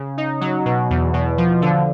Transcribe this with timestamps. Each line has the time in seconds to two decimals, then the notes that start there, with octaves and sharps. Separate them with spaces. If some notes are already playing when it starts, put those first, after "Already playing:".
Already playing: C#3
0.17 D#4
0.41 F#3
0.65 B2
0.90 E2
1.14 B2
1.38 F3
1.62 D3